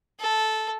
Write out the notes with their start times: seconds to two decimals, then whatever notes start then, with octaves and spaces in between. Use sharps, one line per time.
0.20 A4